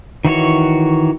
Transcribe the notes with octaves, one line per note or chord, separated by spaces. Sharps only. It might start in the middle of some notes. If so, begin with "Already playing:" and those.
D#3 E3 F#4 C#5